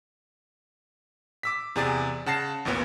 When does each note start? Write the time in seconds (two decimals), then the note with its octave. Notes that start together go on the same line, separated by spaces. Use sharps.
1.43 D6 E6 B6
1.76 E2 C3 G#4 D5 G#5 A6
2.26 C#3 F#5 A5 A#6 C7 E7
2.65 A1 D#2 A#2 B3 C#5